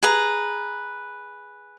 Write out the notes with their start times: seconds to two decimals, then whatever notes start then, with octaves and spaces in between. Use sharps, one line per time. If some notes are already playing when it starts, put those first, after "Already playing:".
0.03 G#4 B4 A#5